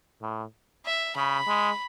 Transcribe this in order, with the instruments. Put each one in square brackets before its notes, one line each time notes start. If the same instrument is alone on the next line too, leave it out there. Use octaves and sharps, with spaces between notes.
[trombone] A2
[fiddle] E5
[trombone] C#3 [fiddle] B5
[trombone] G#3